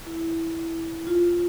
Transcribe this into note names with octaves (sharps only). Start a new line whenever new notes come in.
E4
F4